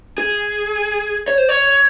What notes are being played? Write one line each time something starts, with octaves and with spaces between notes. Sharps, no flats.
G#4
C#5
C5
C#5